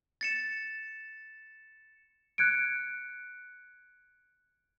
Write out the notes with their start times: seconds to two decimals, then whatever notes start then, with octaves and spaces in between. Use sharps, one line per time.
0.21 A6 C#7 E7
2.38 F#6 G#6 C#7 D7